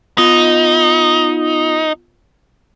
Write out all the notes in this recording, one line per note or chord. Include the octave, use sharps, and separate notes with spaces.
B3 D#4 F4